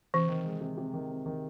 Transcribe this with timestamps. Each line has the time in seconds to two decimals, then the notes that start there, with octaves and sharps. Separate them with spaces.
0.14 C3 E3
0.29 D#3
0.45 G#3
0.61 C3
0.77 C3
0.94 D#3
1.09 C4
1.26 D#3